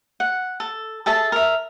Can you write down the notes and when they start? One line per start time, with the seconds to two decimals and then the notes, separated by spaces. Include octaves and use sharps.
0.20 F#5
0.60 A4
1.06 G#4 A4 E5 A5
1.32 A#4 E5